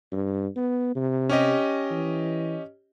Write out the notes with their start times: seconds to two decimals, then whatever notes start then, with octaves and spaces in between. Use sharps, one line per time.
0.12 G2
0.56 B3
0.96 C3
1.29 C#4 G4 D#5
1.91 E3